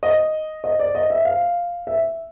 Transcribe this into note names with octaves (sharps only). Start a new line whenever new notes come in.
D#5
D#5
D5
D#5
E5
F5
E5